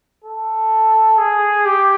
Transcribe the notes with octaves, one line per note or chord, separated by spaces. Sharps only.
A4
G#4
G4